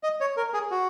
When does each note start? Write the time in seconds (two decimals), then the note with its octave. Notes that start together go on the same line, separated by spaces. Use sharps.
0.03 D#5
0.21 C#5
0.37 A#4
0.54 G#4
0.71 F#4